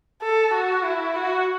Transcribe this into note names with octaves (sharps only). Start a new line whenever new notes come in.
A4
F#4
E4
F#4